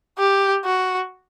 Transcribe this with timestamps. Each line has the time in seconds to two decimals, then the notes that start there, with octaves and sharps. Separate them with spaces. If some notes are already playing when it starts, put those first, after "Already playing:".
0.18 G4
0.65 F#4